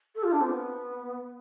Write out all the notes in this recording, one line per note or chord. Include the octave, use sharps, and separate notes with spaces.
A4
F4
D4
C4
B3